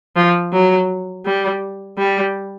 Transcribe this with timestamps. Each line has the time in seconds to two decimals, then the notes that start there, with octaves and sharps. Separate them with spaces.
0.16 F3
0.52 F#3
1.26 G3
1.98 G3